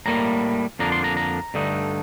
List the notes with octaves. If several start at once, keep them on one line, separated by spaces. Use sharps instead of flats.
A2 G3 A#3 A#5
F2 D3 F3 A#3 D4 A#5
C6
A#5
A#5
G2 D3 A3 D#4